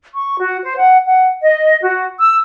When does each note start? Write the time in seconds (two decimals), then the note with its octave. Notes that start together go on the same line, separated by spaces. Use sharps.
0.15 C#6
0.39 F#4
0.62 C5
0.78 F#5
1.05 F#5
1.41 D#5
1.81 F#4
2.19 E6